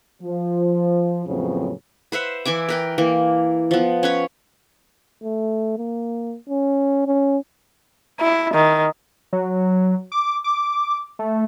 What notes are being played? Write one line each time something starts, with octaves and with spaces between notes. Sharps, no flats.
F3
F2 A2 C#3 F#3 B3 C4
B4 C5 E5 F#5
E3 E4 G#5 D6
A#4 B4 G5
E3 A#3
F3 B3
C#4 B4 C#5
A3
A#3
C#4
C#4
E4
D#3
F#3
D6
D6
A3